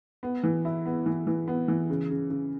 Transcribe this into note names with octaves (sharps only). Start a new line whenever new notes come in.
B3
E3
E4
B3
E3
E3
B3
E3
C#3
C#3
C#3